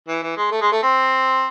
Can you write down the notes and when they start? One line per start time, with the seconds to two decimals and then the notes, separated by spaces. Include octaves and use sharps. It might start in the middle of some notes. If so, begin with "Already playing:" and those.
0.08 E3
0.22 E3
0.37 G#3
0.51 A3
0.61 G#3
0.72 A3
0.82 C4